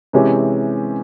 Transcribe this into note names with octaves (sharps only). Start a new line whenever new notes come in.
C3 E3 G#3 C#4 G4